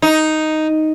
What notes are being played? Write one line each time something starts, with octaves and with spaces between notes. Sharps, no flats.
D#4